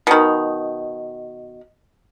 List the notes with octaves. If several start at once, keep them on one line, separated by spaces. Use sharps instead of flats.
B2 D#3